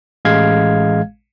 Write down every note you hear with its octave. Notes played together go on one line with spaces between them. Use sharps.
A1 G#3 F5 G#6